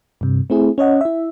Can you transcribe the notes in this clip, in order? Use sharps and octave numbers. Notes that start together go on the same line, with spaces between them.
G2 C3
A3 C4 E4 G#4
C#4 C#5 D#5 F#5
E4 E5